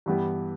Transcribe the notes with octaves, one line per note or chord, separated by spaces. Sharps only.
G2 E3 G3 B3 G4